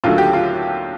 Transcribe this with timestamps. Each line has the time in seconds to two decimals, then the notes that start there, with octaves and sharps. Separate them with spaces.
0.04 D#2 D3 F#3 A3 F4
0.18 G4
0.33 F4